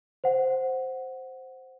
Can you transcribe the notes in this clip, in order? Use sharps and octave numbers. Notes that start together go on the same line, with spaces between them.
C5 F#5